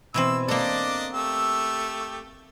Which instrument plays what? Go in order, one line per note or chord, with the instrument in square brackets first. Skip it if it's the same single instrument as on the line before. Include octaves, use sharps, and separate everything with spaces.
[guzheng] B2 E3 C4 [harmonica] E6
[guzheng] A#3 A4 [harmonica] D4 D5 D#5
[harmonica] A3 G4 E6